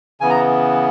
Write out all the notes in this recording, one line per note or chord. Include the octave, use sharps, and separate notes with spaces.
C#3 E3 B3 G#5
A#5